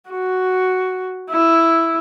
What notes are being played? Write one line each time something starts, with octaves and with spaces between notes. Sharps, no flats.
F#4
E4